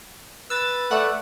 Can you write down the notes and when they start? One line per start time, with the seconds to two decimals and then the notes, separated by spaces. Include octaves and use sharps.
0.50 B4 E6 A6
0.91 A3 D5 E5 F#5